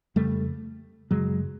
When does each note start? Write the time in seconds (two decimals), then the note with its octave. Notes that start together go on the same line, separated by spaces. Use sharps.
0.16 F2 C#3 G3 A3
1.11 F#2 C#3 F#3 G#3